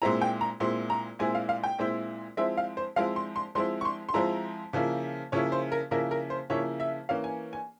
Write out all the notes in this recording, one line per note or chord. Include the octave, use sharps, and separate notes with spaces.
A#2 G#3 C4 E4 A#5
G5
A#5
A#2 G#3 C4 E4 C6
A#5
A#2 G#3 C4 E4 G#5
F5
F5
G5
A#2 G#3 C4 E4
F3 G#3 C4 E4 E5
F5
C5
F3 G#3 C4 E4 F5
C6
C6
F3 G#3 C4 E4 C6
C#6
C6
C6
F3 G#3 C4 E4 A#5
C#3 F3 A#3 E4
C#3 F3 A#3 E4 C#5
C5
A#4
C#3 F3 A#3 E4 A#4
A#4
C5
C#3 F3 A#3 E4 C#5
E5
E3 A#3 C#4 F5
G#5
G#5